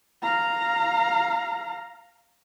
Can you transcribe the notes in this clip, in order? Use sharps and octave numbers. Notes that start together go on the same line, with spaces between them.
F5 A#5